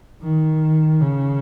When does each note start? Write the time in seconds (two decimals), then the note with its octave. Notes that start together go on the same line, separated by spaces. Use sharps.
0.23 D#3
1.01 C#3